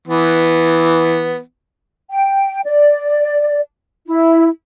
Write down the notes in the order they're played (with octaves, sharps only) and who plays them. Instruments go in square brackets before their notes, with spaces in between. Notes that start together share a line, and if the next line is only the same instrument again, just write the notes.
[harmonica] E3 B3
[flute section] G5
D5
E4